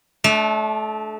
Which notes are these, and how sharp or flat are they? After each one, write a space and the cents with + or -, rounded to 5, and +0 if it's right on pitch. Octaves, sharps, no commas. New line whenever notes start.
A3 -30 D4 +0